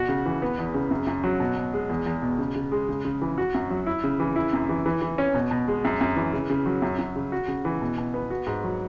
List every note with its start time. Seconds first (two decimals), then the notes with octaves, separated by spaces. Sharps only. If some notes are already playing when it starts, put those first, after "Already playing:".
Already playing: B2 F#4
0.09 C#3
0.26 E3
0.42 B3
0.58 E2
0.74 C#3
0.91 F#2
1.07 F#2
1.24 F#3
1.40 B2
1.57 B2
1.73 G#3
1.89 E2
2.06 E2
2.22 B2
2.38 C#3
2.56 C#3
2.72 G#3
2.89 C#3
3.05 C#3
3.22 E3
3.38 F#4
3.54 F#2
3.70 F#3
3.87 E4
4.04 C#3
4.20 E3
4.36 E4
4.53 F#2
4.69 E3
4.86 E3
5.02 E3
5.18 C#4
5.34 B2
5.51 B2
5.68 G#3
5.85 F#2
6.01 F#2
6.16 E3
6.33 C#3
6.50 C#3
6.66 F#3
6.82 F#2
6.99 F#2
7.16 C#3
7.32 F#4
7.48 C#3
7.65 E3
7.82 B2
7.98 B2
8.14 B3
8.30 F#4
8.46 G#2
8.64 F#3